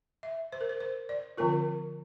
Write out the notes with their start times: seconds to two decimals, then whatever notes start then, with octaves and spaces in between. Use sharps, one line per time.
0.23 E5
0.52 C5
0.61 A#4
0.69 C5
0.80 C5
1.09 D5
1.37 D3 F3 C4 F4 A#4